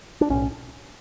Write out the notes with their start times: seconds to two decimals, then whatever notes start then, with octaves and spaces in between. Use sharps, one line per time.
0.21 D4
0.30 B1 A2 C#4